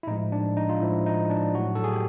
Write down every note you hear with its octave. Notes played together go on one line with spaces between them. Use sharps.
E4
A2 F3 G#3 D#4
D4
D#4
F4
A2 F3 G#3 E4
D#4
D4
A2 F#3 F#4
A4
G#4
G4